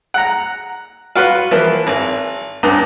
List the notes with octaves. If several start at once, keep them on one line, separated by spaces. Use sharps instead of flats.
F#5 A#5
F4 F#4 B4
E3 F3 A#3
G#1
C#2 G2